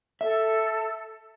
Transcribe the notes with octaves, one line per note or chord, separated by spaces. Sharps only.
A4 E5